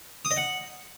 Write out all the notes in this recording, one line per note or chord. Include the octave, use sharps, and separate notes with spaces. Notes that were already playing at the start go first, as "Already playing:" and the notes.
D#6
D#5
F#5